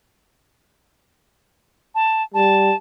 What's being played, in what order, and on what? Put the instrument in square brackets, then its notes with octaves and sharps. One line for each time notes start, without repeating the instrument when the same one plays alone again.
[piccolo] A5
[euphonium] G3 [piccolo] A5